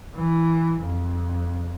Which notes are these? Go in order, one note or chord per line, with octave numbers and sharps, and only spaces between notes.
E3
F2